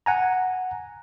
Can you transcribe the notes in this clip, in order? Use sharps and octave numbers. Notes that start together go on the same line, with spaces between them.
F#5 G#5 A#5